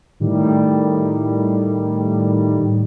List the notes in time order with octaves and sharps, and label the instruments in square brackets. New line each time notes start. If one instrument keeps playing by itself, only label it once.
[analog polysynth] A2 D#3 G3